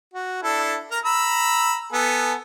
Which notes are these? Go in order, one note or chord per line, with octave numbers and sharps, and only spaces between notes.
F#4
D4 E4 A4
A#4 A#5
A#5 B5 E6
B3 A4 G#5